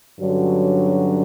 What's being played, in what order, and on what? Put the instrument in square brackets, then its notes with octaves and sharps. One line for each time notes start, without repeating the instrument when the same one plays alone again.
[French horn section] G2 D3 F#3 C#4